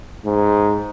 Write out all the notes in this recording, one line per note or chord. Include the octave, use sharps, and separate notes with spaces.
G#2